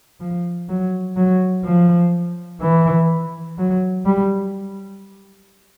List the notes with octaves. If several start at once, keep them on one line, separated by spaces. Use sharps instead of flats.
F3
F#3
F#3
F3
E3
F#3
G3